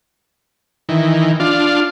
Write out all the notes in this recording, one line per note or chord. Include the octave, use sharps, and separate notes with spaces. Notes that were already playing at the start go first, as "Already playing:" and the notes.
D#3 E3
D4 F4